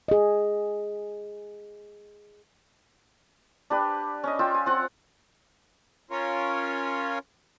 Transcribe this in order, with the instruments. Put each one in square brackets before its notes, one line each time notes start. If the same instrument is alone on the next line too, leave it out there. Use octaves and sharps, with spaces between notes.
[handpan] G#4 D#5
[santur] D4 G4 B4
C#4 D#5
F4 G5 E6
G#5
C4 F4 F#5
[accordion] C#4 F4 A#4 C#5